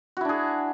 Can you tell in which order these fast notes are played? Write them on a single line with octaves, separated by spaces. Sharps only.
F#4 E4 D4 G#4